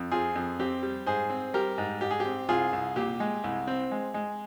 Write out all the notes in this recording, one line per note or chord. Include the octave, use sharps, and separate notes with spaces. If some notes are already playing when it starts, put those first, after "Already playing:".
Already playing: F2
C4 F4 G#4
F2
C4 G4
G3
G#2 G#4 C5
C4
G3 G4 A#4
G#2
G#2 G4
G#4
G4
C4
C2 F4 G#4
C2
A#2 G4
G#3
C2
C4
G#3
G#3